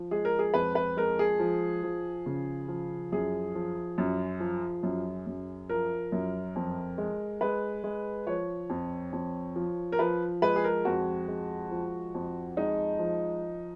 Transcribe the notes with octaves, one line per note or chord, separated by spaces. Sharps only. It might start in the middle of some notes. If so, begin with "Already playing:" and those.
Already playing: F3
G#3 G#4
A#4
G#4
F2 B4
B4
G#3 A#4
G#4
F3
F3
C#3
F3
F#2 G#4
F3
F#2
F3
F#2
F#2
F3 A#4
F#2
F2
G#3
G#3 B4
G#3
F3 C#5
F2
F2
F3
A#4
F3 B4
G#3 B4
G#4
A#4
F2 F#4
G#3
F3
F2
G#3 D#4
F3